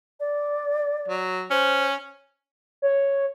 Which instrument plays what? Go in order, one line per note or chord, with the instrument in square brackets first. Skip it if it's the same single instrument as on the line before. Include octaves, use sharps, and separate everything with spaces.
[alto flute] D5
[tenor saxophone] F#3
[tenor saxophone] C#4 [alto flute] C5
[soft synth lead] C#5